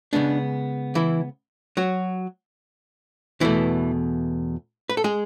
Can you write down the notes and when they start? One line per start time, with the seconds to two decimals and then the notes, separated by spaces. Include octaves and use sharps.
0.13 C#3 G#3 B3 D4
0.95 E3 E4
1.77 F#3 F#4
3.40 E2 B2 E3 A3 E4
4.89 B4
4.97 A4
5.04 G#3 G#4